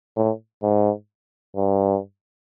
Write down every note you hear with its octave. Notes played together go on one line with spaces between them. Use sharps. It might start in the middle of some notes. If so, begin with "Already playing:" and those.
A2
G#2
G2